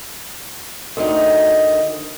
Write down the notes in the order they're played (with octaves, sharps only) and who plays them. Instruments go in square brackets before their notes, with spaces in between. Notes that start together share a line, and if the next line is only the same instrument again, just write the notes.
[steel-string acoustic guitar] D2 D#3 D#4